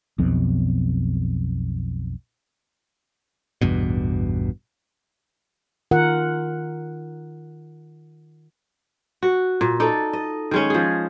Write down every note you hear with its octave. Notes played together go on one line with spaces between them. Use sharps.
B1 F2 B2
A1 E2 G2 B2
D#3 F4 A#4 F#5
F#4
A#2
D#4 A4 D5
D#5
D#3 G#3 C#4
F3 G#4